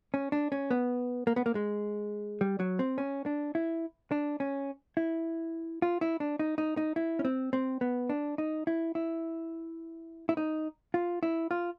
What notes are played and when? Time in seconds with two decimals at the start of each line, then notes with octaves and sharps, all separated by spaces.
0.14 C#4
0.32 D4
0.52 C#4
0.71 B3
1.27 A#3
1.36 B3
1.46 A#3
1.55 G#3
2.41 G3
2.60 F#3
2.79 C4
2.98 C#4
3.26 D4
3.55 E4
4.12 D4
4.40 C#4
4.97 E4
5.82 F4
6.01 E4
6.20 D4
6.39 D#4
6.58 D#4
6.77 D#4
6.96 E4
7.19 C#4
7.25 C4
7.53 C4
7.81 B3
8.09 D4
8.38 D#4
8.67 E4
8.95 E4
10.29 E4
10.37 D#4
10.94 F4
11.23 E4
11.51 F4